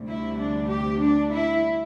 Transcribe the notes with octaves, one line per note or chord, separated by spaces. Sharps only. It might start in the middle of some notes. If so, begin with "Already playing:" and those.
Already playing: D2 C3 G3
E4
D4
G4
D4
E4